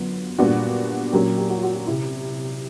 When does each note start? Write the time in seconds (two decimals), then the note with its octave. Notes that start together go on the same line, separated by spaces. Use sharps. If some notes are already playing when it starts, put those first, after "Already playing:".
Already playing: F#2 D3 F#3 B3 F4
0.38 A#2 G3 B3 D4 F#4
1.13 A#2 F#3 A#3 C#4 G4
1.38 G4
1.50 F#4
1.58 F4
1.63 F#4
1.75 F#4
1.87 C3 E4